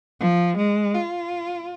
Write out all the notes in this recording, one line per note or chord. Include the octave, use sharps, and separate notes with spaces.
F3
G#3
F4